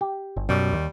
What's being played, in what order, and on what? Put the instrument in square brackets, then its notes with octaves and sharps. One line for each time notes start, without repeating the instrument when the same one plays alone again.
[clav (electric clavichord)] G4
[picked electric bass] G1
[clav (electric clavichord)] F#2 [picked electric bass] B2 [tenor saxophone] G3
[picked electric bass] D#2